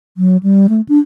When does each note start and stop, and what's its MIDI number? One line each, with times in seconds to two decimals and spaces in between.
0.17 0.37 54
0.43 0.67 55
0.69 0.81 57
0.89 0.99 62